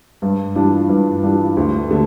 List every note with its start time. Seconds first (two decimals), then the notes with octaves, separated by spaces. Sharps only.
0.22 G2
0.55 E3 G3 D4 F4
0.89 G2
1.23 E3 G3 D4 F4
1.57 D2
1.90 D3 A3